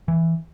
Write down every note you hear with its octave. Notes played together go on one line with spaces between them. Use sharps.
E3